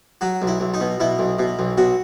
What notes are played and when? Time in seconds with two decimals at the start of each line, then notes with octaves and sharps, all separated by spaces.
0.21 F#3 F#4
0.42 B1
0.47 E4
0.60 B1
0.74 D#4
0.80 B2
1.00 B2 E4
1.19 B1
1.39 B2
1.59 B1
1.78 B1 F#4